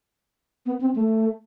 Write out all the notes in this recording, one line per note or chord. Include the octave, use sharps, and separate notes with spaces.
B3
C4
A3